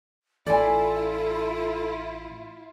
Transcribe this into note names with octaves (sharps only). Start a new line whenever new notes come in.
A1 E4 F4 A4 D5 G#5